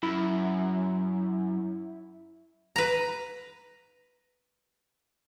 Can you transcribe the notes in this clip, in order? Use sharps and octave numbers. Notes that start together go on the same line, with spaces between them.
F#2 E4
B4 A#5